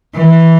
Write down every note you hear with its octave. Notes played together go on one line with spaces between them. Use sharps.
E3